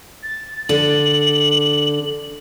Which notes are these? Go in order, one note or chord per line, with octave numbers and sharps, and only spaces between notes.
A6
D3 F#7